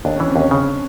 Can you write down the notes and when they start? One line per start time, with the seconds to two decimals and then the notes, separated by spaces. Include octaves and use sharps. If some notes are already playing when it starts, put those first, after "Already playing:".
0.05 D#2 D4
0.16 E3 C#4
0.28 C4
0.36 D#2 C#4
0.51 C#3